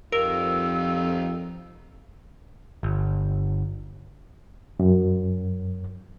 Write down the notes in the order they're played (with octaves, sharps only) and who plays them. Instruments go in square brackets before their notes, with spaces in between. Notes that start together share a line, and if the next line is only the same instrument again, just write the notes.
[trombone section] F2 [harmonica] D#3 G3 F4 [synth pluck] A#4 [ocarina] E6
[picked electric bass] G1
[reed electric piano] F#2